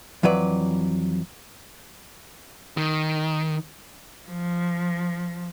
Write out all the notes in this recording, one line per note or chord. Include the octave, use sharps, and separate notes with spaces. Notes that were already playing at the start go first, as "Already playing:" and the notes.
F2 E3 F#3 B4 D5
D#3
F3